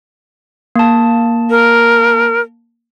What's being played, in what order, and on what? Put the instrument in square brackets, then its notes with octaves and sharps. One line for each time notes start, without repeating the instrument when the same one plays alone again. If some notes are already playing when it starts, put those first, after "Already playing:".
[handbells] A#3 A5
[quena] A#4